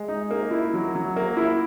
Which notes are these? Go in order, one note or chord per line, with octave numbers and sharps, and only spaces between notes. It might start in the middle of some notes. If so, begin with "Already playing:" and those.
Already playing: G#3
D#4
A#3
E4
F#3
F#3
A#3
E4